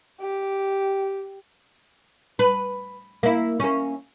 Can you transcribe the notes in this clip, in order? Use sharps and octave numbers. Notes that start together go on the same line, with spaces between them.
G4
B4
A#3 E4
A#3 C#4